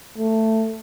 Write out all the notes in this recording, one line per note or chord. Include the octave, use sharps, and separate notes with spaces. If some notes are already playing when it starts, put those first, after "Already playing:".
A3